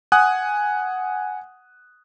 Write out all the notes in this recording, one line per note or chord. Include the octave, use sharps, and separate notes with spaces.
F#5 G#5 D#6 F#6